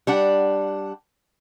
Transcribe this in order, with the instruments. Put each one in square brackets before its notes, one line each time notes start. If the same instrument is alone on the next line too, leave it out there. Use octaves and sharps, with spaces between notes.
[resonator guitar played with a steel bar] G3 D4 F#5